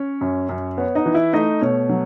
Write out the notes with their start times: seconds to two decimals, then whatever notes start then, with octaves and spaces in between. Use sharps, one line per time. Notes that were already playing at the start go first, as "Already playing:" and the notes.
Already playing: C#4 C#5
0.21 F#2
0.49 F#2
0.77 B3 C#5
0.95 D#4 D#5
1.06 E3
1.14 E4 E5
1.33 A3 D#4 D#5
1.61 B2 C#5
1.89 F#3